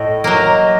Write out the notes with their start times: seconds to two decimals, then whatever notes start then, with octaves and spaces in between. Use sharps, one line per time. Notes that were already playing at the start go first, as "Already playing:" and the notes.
Already playing: A2 D#5
0.24 F#3 A#3